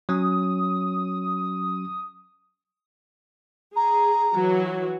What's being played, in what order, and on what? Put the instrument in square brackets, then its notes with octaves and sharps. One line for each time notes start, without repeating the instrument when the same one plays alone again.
[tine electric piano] F#3 C#4 [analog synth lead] D#6
[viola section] G#4 [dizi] A#5
[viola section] E3 F#3 F#4